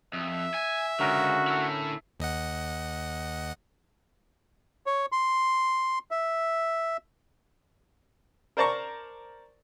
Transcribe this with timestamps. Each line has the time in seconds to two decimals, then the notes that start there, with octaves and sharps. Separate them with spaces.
0.13 F2 E5
0.54 G#5
1.00 C#2 D3 C#4 F#4 A#4
1.47 E4 A4
2.20 D#2 D#5 F#5
4.86 C#5
5.12 C6
6.11 E5
8.57 A#4 C5 D5 A5 A#5 C#6